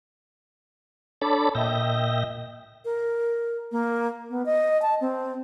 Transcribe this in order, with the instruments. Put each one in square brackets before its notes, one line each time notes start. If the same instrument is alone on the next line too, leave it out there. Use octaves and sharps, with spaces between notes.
[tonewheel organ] D4 A4 C#5 A5 B5 D6
A#2 D#5 E5 G5 A#6
[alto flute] A#4
A#3
B3
D#5
A5
C4